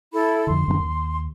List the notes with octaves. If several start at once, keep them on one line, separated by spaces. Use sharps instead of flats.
E4 A4 B5
F2 D3 C6
F#2 C3 D#3
D#2